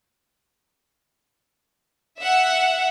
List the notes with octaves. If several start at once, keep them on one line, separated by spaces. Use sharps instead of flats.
E5 F#5